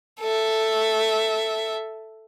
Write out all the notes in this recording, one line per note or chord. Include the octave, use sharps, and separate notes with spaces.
A4 E5